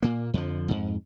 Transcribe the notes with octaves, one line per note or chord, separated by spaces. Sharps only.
A#2 A#3
F2 D3 F3
F2 G#2